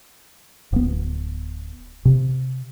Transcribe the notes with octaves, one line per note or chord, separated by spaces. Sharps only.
D1 B3
C3